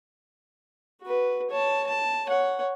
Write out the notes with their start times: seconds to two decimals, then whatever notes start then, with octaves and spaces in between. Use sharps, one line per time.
1.02 F#4 B4
1.50 C#5 A5
1.87 A5
2.27 C#5 F#5